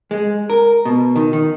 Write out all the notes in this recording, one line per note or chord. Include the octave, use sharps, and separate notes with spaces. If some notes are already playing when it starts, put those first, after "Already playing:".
G#3
A#4
B2
D#3
D#3